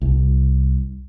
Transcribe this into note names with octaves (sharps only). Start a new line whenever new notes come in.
C2